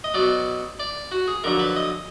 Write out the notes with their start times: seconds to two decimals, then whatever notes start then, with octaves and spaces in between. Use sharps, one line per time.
0.04 D#5
0.14 B2 F#3 D5
0.80 D5
1.12 F#4
1.28 G#4
1.44 F2 D3 F#3 A#4
1.59 B4
1.76 D#5